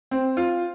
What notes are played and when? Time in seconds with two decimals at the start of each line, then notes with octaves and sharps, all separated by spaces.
0.11 C4
0.37 F4